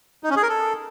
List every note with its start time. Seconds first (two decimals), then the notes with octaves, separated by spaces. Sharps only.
0.24 D#4
0.30 C#4
0.36 G#4
0.43 A#4
0.49 A4